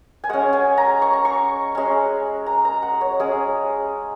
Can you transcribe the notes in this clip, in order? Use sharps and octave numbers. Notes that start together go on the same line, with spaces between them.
G#5
G#3 C#4 F#5
G#5
A#5
C#6
A#5
C#6
G#3 C#4
A#5
A#5
F#5
C#5
G#3 C#4 G#4